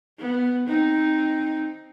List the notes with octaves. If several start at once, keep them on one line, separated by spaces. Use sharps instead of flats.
B3
C4 D#4